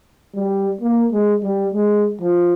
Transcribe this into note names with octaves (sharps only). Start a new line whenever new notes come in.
G3
A#3
G#3
G3
G#3
F3